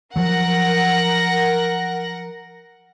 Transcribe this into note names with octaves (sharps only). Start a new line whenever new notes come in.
F3 F#3 A#4 F#5 A#6